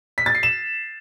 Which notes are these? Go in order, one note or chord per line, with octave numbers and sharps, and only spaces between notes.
B6
A6
C7
E7